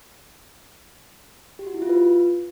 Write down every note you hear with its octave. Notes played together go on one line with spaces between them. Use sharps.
G4
F#4
E4
F4
B4